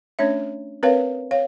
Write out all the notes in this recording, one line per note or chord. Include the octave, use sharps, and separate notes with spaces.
A3 C#4 D4 C#5 E5
C4 A#4 B4 C#5 F5
C#5 F5